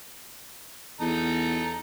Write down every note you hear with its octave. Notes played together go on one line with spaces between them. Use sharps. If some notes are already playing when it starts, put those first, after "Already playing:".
E2 D#4 A4 A#5